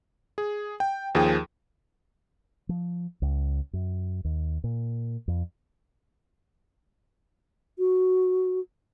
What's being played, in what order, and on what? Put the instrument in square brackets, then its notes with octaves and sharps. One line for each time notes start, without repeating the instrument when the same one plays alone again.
[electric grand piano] G#4
G5
D#2 F3 G#4 G5
[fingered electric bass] F3
C#2
F#2
D#2
A#2
F2
[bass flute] F#4